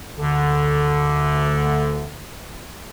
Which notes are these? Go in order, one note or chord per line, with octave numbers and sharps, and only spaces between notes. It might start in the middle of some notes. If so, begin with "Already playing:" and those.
D2 D3